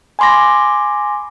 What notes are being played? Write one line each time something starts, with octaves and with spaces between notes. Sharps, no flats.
G#5 B5 C6 D6 A#6